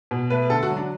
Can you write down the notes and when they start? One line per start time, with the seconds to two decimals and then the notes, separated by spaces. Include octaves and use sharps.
0.11 B2
0.30 A3 B4
0.50 D3 A4
0.63 F#4
0.70 F#3
0.77 D4